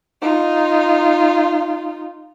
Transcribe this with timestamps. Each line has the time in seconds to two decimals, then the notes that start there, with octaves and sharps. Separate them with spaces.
0.21 D#4 F4